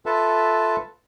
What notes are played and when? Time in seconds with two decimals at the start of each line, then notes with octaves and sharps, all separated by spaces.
0.06 F4 A4 B4 E5 A5